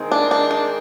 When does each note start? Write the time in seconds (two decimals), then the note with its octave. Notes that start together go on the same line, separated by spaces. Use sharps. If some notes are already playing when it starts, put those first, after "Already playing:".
Already playing: D#3 G#3 C4 D#4 G#4
0.11 D4
0.31 D4
0.51 D4